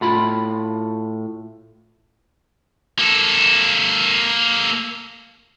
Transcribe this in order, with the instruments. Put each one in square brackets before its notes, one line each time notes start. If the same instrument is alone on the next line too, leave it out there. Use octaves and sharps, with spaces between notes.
[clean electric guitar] A2 F4 B5
[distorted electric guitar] A#3 A4